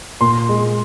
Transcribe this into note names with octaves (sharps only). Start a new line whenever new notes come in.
A#2 C6
G#3